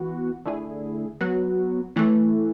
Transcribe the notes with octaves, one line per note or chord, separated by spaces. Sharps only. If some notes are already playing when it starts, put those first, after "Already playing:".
Already playing: E3 B3 F#4
D3 A3 E4 G#4
F#3 B3 F#4
A2 E3 A3